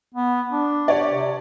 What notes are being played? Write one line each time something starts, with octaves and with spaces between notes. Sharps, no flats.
B3
D4
G4 C#5 D5
C3